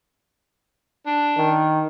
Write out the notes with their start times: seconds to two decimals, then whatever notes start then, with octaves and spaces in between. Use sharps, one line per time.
1.06 D4
1.37 D#3